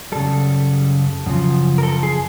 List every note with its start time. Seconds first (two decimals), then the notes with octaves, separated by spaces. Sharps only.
0.12 F#2 C#3 E3 G3 A4
1.26 F#2 C#3 F3
1.78 A#4
1.83 A4
2.03 G#4